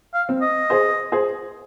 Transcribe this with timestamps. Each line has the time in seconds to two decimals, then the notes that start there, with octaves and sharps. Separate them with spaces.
0.14 F5
0.29 C4
0.42 D#5
0.70 G#4 C5
1.12 G#4 C5